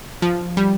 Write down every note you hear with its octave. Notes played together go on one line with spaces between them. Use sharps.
F3
G3